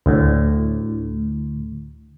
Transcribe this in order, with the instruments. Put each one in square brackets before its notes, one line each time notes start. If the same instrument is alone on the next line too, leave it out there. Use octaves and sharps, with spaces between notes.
[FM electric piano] D2 A2